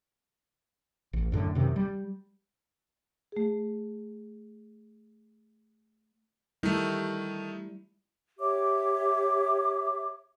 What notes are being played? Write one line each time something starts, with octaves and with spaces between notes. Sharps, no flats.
A1
F#2 A2 D3
F#2 C3 D#3
G3
A3 G#4
D#3 G3 A3 E4
G4 C#5 E5 D6